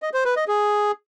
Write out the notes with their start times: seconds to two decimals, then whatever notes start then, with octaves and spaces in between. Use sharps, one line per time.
0.02 D#5
0.14 C5
0.25 B4
0.37 D#5
0.48 G#4